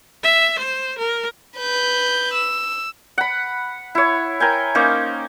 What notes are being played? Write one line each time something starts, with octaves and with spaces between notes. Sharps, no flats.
E5
C5
A#4
B4 G6
E6
F#5 B5
E4 C#5
A#4 G5 G#5
A#3 C#4 D#4 C5